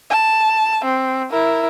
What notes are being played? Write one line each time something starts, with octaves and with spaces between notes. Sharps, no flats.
A5
C4
E4 A#4